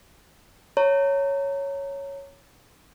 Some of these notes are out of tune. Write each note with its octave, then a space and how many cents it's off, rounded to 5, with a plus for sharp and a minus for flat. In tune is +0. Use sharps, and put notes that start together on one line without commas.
C#5 +0 A#5 -30